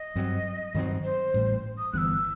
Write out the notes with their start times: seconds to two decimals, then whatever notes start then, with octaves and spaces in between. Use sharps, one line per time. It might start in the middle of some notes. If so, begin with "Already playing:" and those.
Already playing: D#5
0.16 G2 F#3 C4
0.75 G2 D#3 F#3 C4
1.04 C5
1.34 A1 A2 G3
1.78 D#6
1.93 G1 G2 E3 B3 E6 F#6